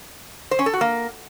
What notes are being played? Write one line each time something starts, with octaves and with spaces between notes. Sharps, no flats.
C5
C#4
A4
F#4
A#3